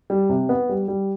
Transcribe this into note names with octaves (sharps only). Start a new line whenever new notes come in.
G3
C3
B3
G3
G3